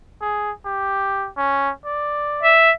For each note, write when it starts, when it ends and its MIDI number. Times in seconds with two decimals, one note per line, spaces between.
0.21 0.52 68
0.65 1.28 67
1.37 1.71 61
1.85 2.55 74
2.43 2.71 76